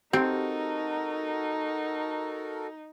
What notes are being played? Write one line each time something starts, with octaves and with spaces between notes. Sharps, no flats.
C4 D#4 F#4 G4 A4 A#4